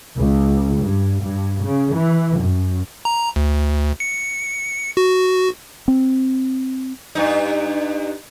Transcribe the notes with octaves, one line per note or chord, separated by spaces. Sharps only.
C#2
G2
G2
C#3
E3
F#2
A#5
D2
C#7
F#4
C4
G2 D#4